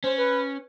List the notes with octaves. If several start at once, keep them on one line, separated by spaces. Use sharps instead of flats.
C#4 C5
B4